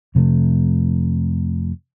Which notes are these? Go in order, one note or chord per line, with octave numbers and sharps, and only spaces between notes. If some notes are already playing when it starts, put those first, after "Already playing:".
F2 C3 F3 A3